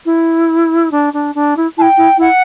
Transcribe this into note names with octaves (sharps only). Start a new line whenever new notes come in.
E4
D4
D4
D4
E4
E4 G5 A5
E4
E4 F#5